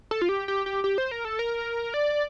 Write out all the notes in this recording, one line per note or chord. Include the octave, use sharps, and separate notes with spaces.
A4
F4
G4
G4
G4
G4
C5
A#4
A4
A#4
D5